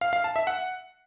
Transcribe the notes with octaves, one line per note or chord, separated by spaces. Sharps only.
F5
F5
A5
E5
F#5